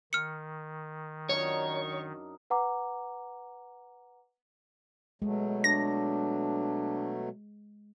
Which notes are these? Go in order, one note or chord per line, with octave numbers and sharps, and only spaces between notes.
D#3 F6 C#7
F#2 D4 D#4 C#5
B4 F#5 A#5 D6
B2 F#3 G#3 A3
D4 A#6